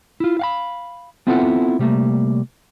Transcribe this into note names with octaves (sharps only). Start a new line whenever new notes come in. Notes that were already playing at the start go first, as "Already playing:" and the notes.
E4 F4
F5 F#5 B5
B3 C4 E4 F4 A4 F#5
C3 G3 A3 A#3